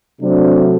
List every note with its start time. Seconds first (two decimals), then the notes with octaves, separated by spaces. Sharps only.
0.21 C3 F#3 A3 C4 D4